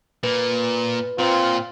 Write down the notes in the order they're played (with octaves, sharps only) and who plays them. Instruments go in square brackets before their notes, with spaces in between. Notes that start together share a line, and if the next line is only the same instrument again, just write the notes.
[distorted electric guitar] A#2 [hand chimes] B4
[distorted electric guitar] A#2 [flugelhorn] C4 [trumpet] F4